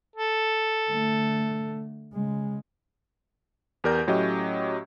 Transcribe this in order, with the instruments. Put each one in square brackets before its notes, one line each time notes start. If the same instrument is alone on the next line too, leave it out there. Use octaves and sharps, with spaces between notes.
[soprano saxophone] A4
[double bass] D3 A3
C#3 G#3
[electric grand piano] E2 G4 A#4 D5 G6
A2 F#3 C#4 G4 D#5